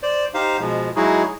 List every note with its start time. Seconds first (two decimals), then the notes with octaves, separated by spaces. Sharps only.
0.03 C5 D5
0.34 D#4 G4 C5 F5
0.60 B2 F3 G#3
0.96 F#3 G#3 D#4 E4 F#4 G#4